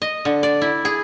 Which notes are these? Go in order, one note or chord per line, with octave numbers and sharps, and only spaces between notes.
D#5
D3
D5
E4
G#4